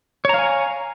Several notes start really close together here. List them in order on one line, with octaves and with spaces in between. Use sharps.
C#5 A#5 F5 G#5